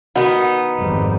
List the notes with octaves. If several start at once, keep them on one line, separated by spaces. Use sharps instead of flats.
D#3 B3 D#4 F#4
G#1 F2 G3